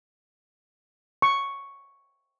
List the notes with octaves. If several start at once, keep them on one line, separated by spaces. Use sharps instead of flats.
C#6